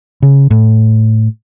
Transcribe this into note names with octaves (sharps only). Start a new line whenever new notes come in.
C#3
A2